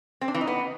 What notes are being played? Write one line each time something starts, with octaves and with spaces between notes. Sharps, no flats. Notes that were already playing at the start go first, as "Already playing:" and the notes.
C4
D4
E3
D#4
B3